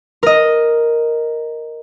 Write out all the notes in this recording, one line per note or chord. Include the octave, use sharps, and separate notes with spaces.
A#4 D#5